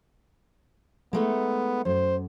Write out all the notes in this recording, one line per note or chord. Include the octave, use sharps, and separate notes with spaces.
G#3 A3 B3 D#4
F#2 C5